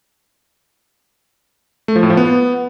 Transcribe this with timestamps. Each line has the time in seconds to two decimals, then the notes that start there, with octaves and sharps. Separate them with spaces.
1.88 A3
1.96 F3
2.03 A2
2.10 F3
2.17 B3